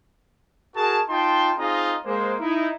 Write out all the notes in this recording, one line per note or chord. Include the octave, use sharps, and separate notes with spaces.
F#4 G#4 A#4 A5
D#4 F4 G5 A5 C6
C4 D#4 F4 G#4 D#5 A#5
G#3 A#3 C5
D#4 E4